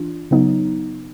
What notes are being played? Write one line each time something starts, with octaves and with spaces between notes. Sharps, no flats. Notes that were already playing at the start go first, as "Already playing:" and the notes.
Already playing: E3 D4 F4
C#3 F#3 B3 D#4